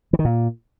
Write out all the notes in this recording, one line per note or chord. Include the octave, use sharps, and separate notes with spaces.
E3
D#3
A#2